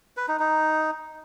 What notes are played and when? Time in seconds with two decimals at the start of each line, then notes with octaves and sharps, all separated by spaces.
0.17 B4
0.28 D#4
0.39 D#4